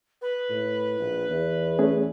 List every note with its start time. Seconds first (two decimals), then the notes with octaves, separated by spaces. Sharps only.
0.22 B4
0.50 A2
1.00 A#1
1.29 E2
1.79 A3 C#4 G#4